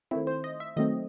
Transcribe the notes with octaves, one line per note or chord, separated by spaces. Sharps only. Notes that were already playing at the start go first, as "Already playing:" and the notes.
D#3 A3 C4 E4
C5
D#5
E5
D#3 F#3 A3 C4 D#5